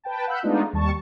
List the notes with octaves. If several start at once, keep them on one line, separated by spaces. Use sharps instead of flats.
B4 G5 A5
F5 F#5 B5 E6 F#6 G6
G#3 A3 B3 D4 D#4 F4
D#2 G3 A5 C#6